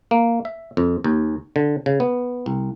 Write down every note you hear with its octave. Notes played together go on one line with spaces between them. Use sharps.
A#3
E5
F2
D#2
D3
C#3
B3
C2